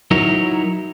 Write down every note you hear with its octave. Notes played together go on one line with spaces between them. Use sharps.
F#3 D#4 E4 A#4 C#5